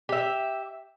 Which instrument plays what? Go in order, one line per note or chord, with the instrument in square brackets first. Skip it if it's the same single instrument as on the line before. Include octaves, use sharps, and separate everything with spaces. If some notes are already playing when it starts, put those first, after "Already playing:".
[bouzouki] G4 E5